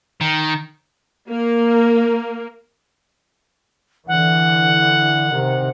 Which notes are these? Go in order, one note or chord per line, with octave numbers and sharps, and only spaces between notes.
D#3
A#3
D3 E3 F#5
C3 D#3